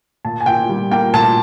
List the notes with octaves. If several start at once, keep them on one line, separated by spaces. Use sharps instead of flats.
A#2 A5
G#5
A#2 G5
G3
A#3 G5
A#2 A5